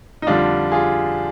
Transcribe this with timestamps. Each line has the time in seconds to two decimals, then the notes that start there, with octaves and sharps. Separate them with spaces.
0.22 D#4
0.27 F2 D3 G3 D4 F4
0.72 F4 G#4